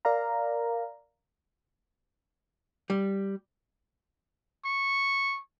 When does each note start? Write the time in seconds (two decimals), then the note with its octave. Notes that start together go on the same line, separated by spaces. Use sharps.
0.05 A#4 D5 F5 A#5
2.90 G3
4.65 C#6